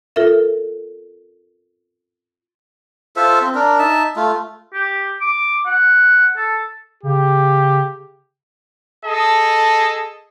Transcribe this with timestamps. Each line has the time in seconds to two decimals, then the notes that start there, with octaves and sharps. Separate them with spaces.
0.16 F4 A4 A#4 E5
3.16 F4 A4 C5 E5
3.41 C4
3.55 D4 A#4
3.79 D#4 E5 A5
4.16 A3 F4
4.74 G4
5.21 D6
5.66 F#5
6.37 A4
7.03 C#3 G4
9.06 G#4 A4 D#5 A5